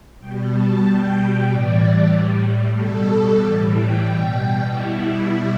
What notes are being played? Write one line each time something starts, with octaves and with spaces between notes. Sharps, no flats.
B2 G3 G5
A5
B2 G3 G5
A2 E3 G3 D5
A2 G3
B2 G3 A4
A2 E3 G3 D5
G5
B2 G3 G5
B2 G3 E4